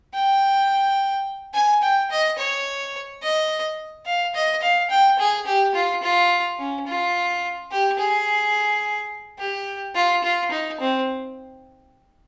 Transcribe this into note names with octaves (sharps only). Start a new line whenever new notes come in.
G5
G#5
G5
D#5
C#5
D#5
F5
D#5
F5
G5
G#4
G4
F4
F4
C#4
F4
G4
G#4
G4
F4
F4
D#4
C4